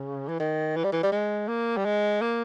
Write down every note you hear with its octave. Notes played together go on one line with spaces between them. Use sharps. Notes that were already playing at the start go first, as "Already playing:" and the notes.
Already playing: C#3
E3
D#3
E3
G3
E3
G3
G#3
A#3
G3
G#3
A#3